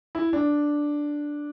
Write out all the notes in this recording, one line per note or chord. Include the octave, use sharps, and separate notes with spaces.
E4
D4